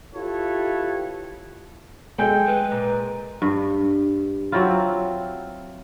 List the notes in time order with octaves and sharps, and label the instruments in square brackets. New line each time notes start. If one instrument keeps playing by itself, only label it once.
[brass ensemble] E4 F4 G4 A4 B4 C#5
[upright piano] G#3 G#5 G6 [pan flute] A4 [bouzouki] G5
[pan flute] B4
[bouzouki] A#2
[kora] G2
F#3 C4 E4 F4